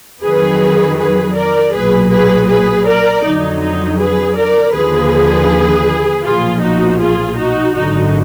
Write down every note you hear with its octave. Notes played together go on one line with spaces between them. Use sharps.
F2 D#3 F#3 G#4 B4
G#4 B4
A#4 D5
B1 A#2 F#3 G#4 B4
G#4 B4
G#4 B4
A#4 D5
F2 D3 F#3 D#4
D#4
G#4 B4
A#4 D5
D#2 D3 F3 G#4 B4
B1 A#2 F3 F4 G#4
D#4 F#4
F4 G#4
D#4 F#4
G#1 F#2 D3 D#4 F#4